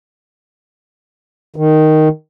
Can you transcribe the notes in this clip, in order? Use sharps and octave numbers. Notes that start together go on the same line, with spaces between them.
D#3